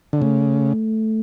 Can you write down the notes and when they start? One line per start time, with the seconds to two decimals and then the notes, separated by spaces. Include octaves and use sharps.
0.13 D3
0.21 C#3 A3